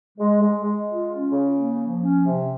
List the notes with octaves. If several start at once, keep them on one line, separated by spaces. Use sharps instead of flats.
G#3
G#3
G#3
F4
C#4
C#3
A#3
F3
C#4
C3